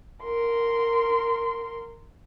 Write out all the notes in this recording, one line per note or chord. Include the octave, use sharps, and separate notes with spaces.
A#4 C6